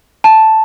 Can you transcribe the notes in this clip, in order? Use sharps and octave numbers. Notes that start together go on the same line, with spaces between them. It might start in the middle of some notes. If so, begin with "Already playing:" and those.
A5